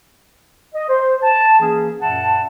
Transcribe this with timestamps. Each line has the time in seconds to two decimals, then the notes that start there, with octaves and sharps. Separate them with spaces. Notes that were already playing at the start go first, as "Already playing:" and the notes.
0.75 D#5
0.89 C5
1.23 A5
1.60 E3 A#3 C#4 G#4
2.01 F#2 A#2 E5 F#5 A5